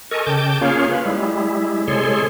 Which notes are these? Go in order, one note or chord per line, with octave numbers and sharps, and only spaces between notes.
A4 A#4 D#5 G#5 C#6
C#3 G5 A5 D6 G6
A#3 C#4 F4 G#4 C#5 F5
B4
G3 G#3 E4
C3 G#3 G#4 A4 C#5 C6